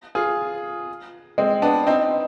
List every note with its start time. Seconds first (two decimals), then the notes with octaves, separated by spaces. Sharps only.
0.15 F4 G#4
1.38 G#3 C4
1.62 B3 D4
1.87 C4 D#4